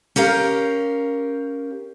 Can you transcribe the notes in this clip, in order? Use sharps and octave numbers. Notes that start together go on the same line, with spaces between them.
C#4 G4 A#4 F5